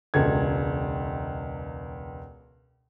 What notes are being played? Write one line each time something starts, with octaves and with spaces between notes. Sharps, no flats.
E1 C#2 A4 G#6